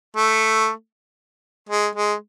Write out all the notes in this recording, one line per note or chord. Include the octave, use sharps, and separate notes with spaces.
A3
G#3
G#3